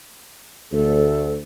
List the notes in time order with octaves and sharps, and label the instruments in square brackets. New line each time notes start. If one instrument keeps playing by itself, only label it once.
[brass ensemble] D2 [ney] A4